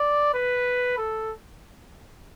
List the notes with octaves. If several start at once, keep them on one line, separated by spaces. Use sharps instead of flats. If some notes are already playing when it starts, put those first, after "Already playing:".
Already playing: D5
B4
A4